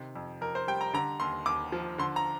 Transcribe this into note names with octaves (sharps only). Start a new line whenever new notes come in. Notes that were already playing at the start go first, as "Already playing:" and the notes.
Already playing: C3 D#3
F2
F2 A#4
C5
G3 G5
A#5
D3 A#5
D#2 C6
D#2 D6
F3
D3 C6
A#5